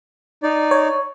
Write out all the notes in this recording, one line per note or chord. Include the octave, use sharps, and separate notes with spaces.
D#4 D5
C#5